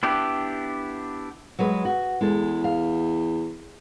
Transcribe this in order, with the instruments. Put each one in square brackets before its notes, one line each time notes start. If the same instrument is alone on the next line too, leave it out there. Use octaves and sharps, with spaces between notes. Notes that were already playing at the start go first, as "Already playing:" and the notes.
[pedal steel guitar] B3 D4 E4 G4
[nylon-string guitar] F#3 G#3 B4
F#4
[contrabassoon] E2 [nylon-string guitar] G#3 A4
[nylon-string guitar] F5